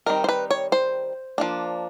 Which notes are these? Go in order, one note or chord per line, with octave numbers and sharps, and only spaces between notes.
D#3 G3 C4 D#4 A#4
C5
B4
C#5
C5
F3 A#3 D4